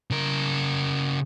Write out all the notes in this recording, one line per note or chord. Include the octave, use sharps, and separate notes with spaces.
C#3 A#4